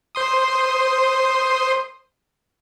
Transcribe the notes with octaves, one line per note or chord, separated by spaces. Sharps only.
C5 C6 D#6